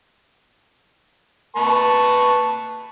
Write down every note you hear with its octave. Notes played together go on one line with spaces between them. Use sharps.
B4 A5 C#6